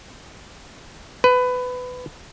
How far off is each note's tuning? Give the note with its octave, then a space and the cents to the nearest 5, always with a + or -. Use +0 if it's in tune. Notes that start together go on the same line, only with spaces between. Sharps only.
B4 +20